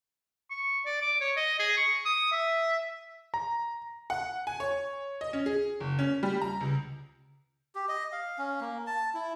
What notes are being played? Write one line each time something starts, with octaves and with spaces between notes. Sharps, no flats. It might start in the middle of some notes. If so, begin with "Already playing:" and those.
C#6
D5
D6
C#5
D#5
G#4
C#6
D#6
E5
A#5
F#5
G#5
C#5
D#5
C#4
G#4
F#1
C#4
G3
A#5
C#2
G4
D#5
F5
C#4
A#3
A5
E4